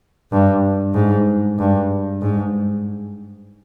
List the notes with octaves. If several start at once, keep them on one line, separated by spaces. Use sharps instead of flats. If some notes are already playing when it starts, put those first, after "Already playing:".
G2
G#2
G2
G#2